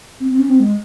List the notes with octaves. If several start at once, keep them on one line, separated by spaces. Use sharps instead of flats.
C4
C4
C#4
C4
G#3